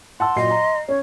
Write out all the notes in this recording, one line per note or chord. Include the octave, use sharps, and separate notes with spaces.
F#5 A5 C6 E6
A#2 F#3 D#5 C7
A#5
C#4 C#5